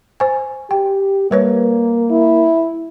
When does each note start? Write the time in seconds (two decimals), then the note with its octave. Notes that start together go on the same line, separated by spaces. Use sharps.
0.20 C5 G#5
0.71 G4 G5
1.31 G3 A#3 B4 C#5
2.11 E4